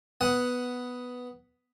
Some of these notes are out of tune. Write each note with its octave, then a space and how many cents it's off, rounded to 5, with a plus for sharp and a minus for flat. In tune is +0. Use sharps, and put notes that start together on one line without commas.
B3 +0 F#5 +0 D#6 +5